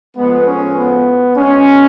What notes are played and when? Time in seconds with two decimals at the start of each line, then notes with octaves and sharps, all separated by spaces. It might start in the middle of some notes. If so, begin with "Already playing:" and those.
0.16 A2 F3 G#3 B3
0.46 C#4
0.76 B3
1.36 B2 G#3 C#4